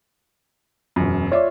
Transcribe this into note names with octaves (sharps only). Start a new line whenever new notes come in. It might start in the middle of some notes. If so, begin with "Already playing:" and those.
E1 F#2
F4 C#5 D5 E5